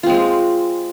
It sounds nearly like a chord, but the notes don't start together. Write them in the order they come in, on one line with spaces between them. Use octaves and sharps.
F4 C4 G#3